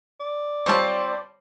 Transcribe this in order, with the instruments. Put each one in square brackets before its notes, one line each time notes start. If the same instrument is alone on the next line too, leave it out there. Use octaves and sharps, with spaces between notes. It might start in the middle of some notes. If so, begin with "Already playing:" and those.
[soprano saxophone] D5
[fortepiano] G3 C5 C#5 [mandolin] C4 F4 A5